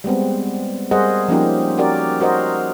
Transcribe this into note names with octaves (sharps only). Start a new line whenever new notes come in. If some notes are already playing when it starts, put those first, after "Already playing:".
G3 G#3 B3 C4
G3 G#4 A#4 C5 D#5 F#5
F3 A#3 C#4 D#4 G4
C#4 F#4 G4 A#4 D5
F#4 A#4 C5 D#5